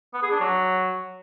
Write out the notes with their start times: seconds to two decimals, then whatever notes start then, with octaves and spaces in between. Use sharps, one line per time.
0.14 B3
0.23 G#4
0.31 D4
0.40 F#3